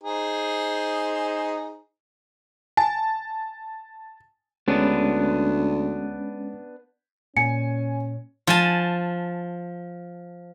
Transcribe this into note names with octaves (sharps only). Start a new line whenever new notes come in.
D#4 G#4 C5
G#5 A5
D2 G#3 B3 C#4 D4
A#2 C#4 G#5 C#7
F3 G#5 A5